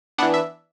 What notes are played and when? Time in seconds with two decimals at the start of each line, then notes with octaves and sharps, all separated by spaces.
0.18 E3 B3 D4 F#5
0.34 E5